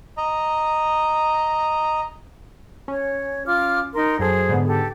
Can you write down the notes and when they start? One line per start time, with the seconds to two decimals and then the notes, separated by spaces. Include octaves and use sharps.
0.17 D#5 A#5
2.88 C#4 C#5
3.47 F4 D6 F6
3.94 D#4 A#4 C6
4.19 F#2 G#4 A4 C5
4.49 G#2 D3 B3
4.66 G4 A4